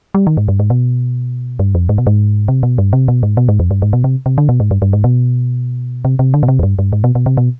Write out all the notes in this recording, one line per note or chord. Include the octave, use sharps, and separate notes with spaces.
G3
D#3
G#2
G2
G#2
B2
G2
F2
G#2
B2
G#2
C3
B2
G2
C3
B2
G#2
B2
G#2
F2
G2
G#2
B2
C3
C3
D3
B2
G#2
G2
G2
G#2
B2
C3
C3
D3
B2
C3
F2
G2
G2
G#2
B2
B2
C3
B2